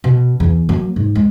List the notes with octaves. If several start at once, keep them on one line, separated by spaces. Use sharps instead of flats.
B2
E2
F#3 A#3
G#2
G#3